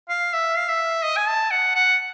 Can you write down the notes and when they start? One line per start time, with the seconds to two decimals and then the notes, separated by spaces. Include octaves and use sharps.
0.09 F5
0.33 E5
0.57 F5
0.68 E5
1.04 D#5
1.17 G#5
1.28 A5
1.51 F#5
1.75 F#5